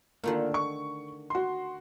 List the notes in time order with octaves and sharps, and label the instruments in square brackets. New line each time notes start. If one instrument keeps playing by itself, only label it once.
[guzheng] D3 D#3 A3 [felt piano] A#3 F4
[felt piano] C#6
F#4 C6